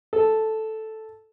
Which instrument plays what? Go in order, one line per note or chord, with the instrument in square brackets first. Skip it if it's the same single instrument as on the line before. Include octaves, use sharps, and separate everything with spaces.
[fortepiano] A4